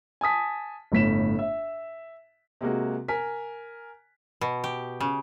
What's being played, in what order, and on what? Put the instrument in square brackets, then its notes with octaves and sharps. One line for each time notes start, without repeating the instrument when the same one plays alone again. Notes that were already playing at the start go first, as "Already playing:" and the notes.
[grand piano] G#5 A5 D#6 B6
G1 A2 B6 E7
E5
[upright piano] C3 G#3 A#3 F#4
A#4 G#5 B6
[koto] B2
G4
C#3